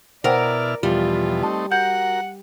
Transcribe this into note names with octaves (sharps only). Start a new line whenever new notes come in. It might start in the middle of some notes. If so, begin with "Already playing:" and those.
B2 E4 A#4 C5 D5 F#5 G5 F6
E2 B2 F3 G3 F4
A3 C4 D#4 A5
F#4 A#4 F#5 G6